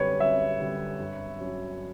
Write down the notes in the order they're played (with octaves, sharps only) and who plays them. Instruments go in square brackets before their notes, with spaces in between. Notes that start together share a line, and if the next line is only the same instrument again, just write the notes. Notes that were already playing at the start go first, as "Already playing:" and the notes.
Already playing: [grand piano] F#2 D3 G3 [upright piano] B4 C#5
[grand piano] F#2 [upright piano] E5
[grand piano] D3 G3
G2
F#3 C#4 F#4